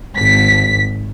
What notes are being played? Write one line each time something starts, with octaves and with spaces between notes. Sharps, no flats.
G#1 B6